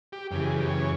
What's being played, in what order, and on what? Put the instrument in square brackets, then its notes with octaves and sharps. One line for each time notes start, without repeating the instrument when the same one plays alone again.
[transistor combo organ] G4
F#2 C#3 E3 G4
G#4
G4
C#5